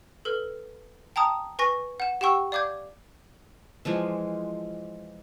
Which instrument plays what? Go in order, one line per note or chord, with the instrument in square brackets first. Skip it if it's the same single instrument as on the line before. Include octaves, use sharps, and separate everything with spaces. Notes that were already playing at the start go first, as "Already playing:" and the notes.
[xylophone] A4 B4 F6
G5 A5 A#5 D#6
B4 G#5 C#6 A#6
F#5 E7
G4 F#5 G5 C#6 E6
D5 F5 D6 G6 G#6
[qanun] E3 F3 G#3